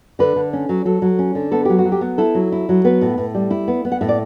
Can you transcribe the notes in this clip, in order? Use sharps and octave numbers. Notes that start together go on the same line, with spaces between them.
D3 B4
D3
C#4
F#3
F#3 A4
F#3
C#4
D3
B3 A4
F#3 G4
F#4
F#3
G4
B3
E4 A4
F#3
E4
F#3
B3 B4
A2
A2
G3
E4
B3
B3
F#5
A2 E5
D5